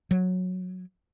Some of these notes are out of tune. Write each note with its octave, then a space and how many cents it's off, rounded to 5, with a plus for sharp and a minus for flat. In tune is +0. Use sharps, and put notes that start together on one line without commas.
F#3 -15